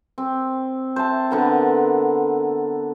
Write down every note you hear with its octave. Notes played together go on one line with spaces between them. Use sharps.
C4
C5 E5 A5
D3 B3 A#4